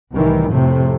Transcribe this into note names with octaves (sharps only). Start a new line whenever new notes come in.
C2 A2 D#3 E3
F2 A2 C3 A3